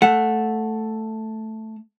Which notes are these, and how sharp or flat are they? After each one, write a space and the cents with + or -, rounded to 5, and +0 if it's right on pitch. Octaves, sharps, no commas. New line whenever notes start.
A3 +0 F#5 -10